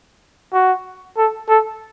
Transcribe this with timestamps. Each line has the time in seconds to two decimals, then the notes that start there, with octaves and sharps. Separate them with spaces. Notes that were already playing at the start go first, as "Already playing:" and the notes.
0.53 F#4
1.17 A4
1.49 A4